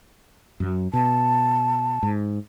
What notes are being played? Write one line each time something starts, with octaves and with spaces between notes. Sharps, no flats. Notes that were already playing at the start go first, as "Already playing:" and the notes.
F#2 F#3
B2 A5
G#2